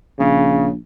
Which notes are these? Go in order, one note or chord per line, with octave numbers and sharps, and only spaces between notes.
A#1 C#3